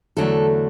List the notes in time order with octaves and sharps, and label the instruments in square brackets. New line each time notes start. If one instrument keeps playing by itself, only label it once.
[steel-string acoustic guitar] E2 D3 F#3 A3 D4 A4